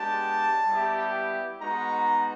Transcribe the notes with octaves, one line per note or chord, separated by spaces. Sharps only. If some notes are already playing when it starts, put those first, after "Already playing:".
Already playing: G#3 B3 D4 G4 A5
G3 B3 E4 G4
G#3 B3 D#4 F#4 A#5